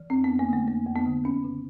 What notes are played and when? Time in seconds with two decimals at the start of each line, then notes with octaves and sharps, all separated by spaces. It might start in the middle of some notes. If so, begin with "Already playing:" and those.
Already playing: E3
0.10 F2 C4
0.24 B3
0.30 F2
0.39 A#3
0.49 D3 A3
0.68 F2 A#3
0.86 F2
0.96 B3
1.06 D3
1.24 E2 C#4
1.44 C#3